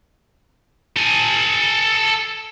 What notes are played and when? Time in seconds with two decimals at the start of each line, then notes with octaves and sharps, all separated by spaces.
0.96 A4 G#5